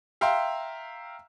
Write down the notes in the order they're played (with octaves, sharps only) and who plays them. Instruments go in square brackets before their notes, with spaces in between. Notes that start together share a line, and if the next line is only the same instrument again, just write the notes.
[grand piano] E5 F5 G5 A#5 C6